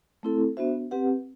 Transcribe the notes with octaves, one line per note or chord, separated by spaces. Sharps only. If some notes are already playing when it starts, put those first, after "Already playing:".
A3 C4 E4 A4
B3 D4 F#4 C5 E5
C4 G4 B4 F#5